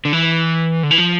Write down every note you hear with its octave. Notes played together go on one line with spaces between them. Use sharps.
D3
E3
D3
E3
F3